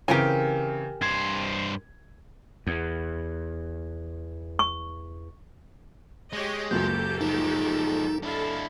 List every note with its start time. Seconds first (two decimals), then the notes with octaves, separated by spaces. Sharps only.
0.08 C#3 E3 C4 G4 A#4 G#5
1.01 G2 C5 G#6
2.67 E2
4.59 C#6
6.33 G#3 G4 C#5 D#5
6.71 F#1 C#2 F#2 A#3 G4 A4 G6
7.21 F3 G#3 D#4
8.23 D4 E4 A4 F5